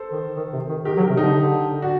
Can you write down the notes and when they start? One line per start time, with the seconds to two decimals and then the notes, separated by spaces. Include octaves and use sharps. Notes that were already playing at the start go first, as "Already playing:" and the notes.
Already playing: A4 C5
0.11 D#3
0.36 D#3
0.53 C3
0.69 D#3
0.85 D#3 G4 A#4
0.97 F#3
1.01 G4 A#4
1.09 C3
1.17 D3 D#4 G4
1.34 D3
1.82 D4 F#4